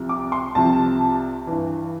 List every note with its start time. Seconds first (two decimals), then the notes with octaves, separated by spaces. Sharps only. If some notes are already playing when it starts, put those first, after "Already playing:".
Already playing: C2 C3 F3
0.09 D6
0.32 C6
0.55 C2 C3 F3 A5
1.47 G2 E3